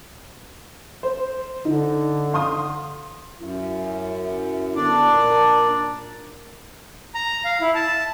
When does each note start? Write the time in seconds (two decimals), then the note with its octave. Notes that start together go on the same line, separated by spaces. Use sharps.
1.03 C5
1.65 D3 D#4
2.33 F5 C6 D#6
3.40 F#2 E4
4.76 D3 B3 D4 D5
5.11 A#2 A#4
7.15 A#5
7.45 F5
7.61 E4
7.75 A5